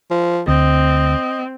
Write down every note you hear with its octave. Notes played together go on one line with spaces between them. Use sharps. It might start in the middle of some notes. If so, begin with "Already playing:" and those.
F3
D2 C4 D#5